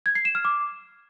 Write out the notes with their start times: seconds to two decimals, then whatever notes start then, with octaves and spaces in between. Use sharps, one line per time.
0.06 G#6
0.15 C7
0.25 E7
0.35 F6
0.45 D6